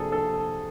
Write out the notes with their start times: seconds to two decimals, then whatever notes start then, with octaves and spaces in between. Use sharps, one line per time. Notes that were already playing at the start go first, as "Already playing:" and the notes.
Already playing: C3 F3 A#3 D4 G#4 A4
0.12 A4